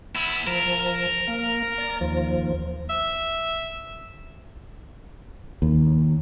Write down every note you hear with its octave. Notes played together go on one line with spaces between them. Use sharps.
B3 E4 B5 E6
F3 A#4 A5
A#3
D5
D#2 F3
E5
D#2